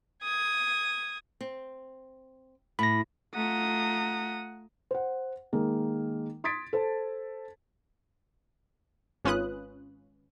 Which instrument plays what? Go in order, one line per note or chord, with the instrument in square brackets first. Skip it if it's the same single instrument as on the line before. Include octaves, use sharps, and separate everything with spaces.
[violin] D#6 G#6
[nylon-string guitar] C4
[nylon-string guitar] A2 [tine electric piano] B5 A#6
[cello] A3 F4 [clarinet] F#5 [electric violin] A#5 D#6
[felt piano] C5 F#5
D#3 G#3 A#3
C6 D#6 G#6 A6 B6 D7
A4 C5 A5
[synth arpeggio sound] G#1 C#4 F4 B4 D#6 F#6